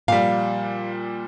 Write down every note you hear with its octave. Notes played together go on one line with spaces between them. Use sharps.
A#2 F3 G3 F5